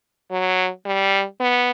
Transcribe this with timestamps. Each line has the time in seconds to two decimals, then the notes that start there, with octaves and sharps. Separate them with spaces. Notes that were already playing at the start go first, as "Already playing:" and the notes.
0.31 F#3
0.86 G3
1.40 B3